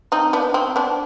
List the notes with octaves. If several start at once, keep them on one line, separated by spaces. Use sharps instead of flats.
C4 D#4
B3 D4
C4
B3 D4